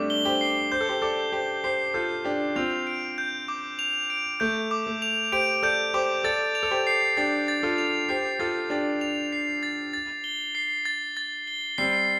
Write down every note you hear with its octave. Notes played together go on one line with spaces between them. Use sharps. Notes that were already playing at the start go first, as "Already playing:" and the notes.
Already playing: G3 A3 C4 D4 D6
G7
G4 C5
C7
C5 G6
A4
G4 C5
A4 D5 D6
G4 C5 G7
G4 C5 C7
F4 A4 G6
D4 G4 D6
C4 F4 F7
D7
G6
D6
F7
D7
A3 G6
D6
A3
F7
G4 C5 D7
A4 D5 G6
G4 C5 D6
A4 D5 A6
F7
A4
G4 C5
C7
D4 G4 A6
A6
F4 A4
F7
G4 C5 C7
F4 A4 A6
D4 G4 A6
F7
C7
A6
A6
G7
C7
A6
A6
G7
G3 C4 C7